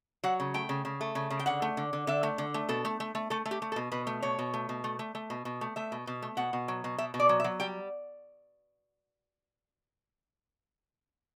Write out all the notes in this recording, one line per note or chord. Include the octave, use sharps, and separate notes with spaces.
F#3 F#5
C#3
A3 G5
C#3
C#3
A3
C#3
C#3
G5
D3 F#5
A3
D3
D3
D3 E5
A3
D3
A3
B2 A4
A3
A3
A3
A3 A4
A3
G4
A3
A4
B2
B2 B4
A3
B2 C#5
B2
A3
B2
A3
A3
A3
B2
B2
A3
A3 E5
B2
B2
A3
B2 F#5
B2
F#3
B2
B2 E5
B2
D5
F#3
E5
F#3
G3 G5